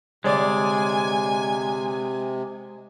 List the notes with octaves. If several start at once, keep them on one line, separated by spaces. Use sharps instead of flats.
G1 C3 G#3 D5 G#5